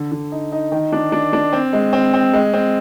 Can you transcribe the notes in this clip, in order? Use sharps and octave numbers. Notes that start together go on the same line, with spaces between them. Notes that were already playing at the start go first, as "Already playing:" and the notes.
Already playing: D3
D3
D#4
D#4
D#3
D4
D4
D4
C4
G#3
C4
C4
G#3
C4